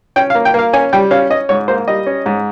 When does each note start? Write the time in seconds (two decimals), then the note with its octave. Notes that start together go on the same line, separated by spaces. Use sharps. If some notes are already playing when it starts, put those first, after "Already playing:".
0.16 C#4 G5
0.30 F5
0.35 A#3
0.45 G5
0.54 A#3 F5
0.73 C#4 G#5
0.93 G3 G5
1.11 C#4 F5
1.30 C#4 D#5
1.49 G#2 C#5
1.68 A#3 C5
1.88 G3 D#5
2.07 C#4
2.26 G#2